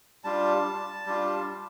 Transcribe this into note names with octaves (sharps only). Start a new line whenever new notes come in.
G3 D4 F4 A5
G3 D4 F4